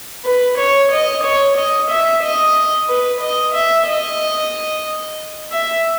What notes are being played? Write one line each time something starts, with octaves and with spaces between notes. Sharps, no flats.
B4
C#5
D#5
C#5
D#5
E5
D#5
B4
D#5
E5
D#5
E5